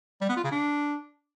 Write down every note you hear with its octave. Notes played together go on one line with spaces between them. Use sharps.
G3
B3
F4
C#3
D4